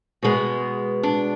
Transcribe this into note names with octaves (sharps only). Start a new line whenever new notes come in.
B2 G#3 B3
D4